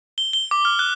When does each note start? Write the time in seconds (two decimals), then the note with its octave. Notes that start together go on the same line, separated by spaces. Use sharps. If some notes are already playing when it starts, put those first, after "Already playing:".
0.18 G7
0.33 G7
0.51 D6
0.65 F6
0.79 F#6